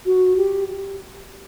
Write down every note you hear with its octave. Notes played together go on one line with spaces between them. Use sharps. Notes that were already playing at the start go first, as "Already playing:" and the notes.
F#4
G4